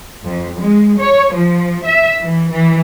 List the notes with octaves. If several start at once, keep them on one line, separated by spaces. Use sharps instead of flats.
F2
G#3
C#5
F3
E5
E3
E3